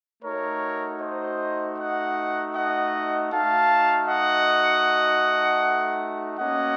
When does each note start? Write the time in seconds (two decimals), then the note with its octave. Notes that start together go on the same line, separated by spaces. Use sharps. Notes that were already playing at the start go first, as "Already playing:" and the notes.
0.23 A3 D#4 F#4 A#4 C#5
1.00 C5 D#5
1.77 D#5 F#5
2.54 D#5 F#5
3.31 A3 D#4 F#4 F5 A5
4.07 D#5 F#5
6.38 A#3 C#4 F#4 D#5 F#5